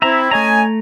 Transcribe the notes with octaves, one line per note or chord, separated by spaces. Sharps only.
C4 E4 E5 A#5
A3 C#4 D#5 G#5 A#5